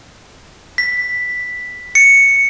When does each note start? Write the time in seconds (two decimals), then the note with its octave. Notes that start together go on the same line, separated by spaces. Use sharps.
0.78 B6
1.95 C#7